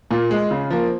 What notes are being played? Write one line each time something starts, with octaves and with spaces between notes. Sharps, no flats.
A#2 F4
G#3
C#3
F3 A#3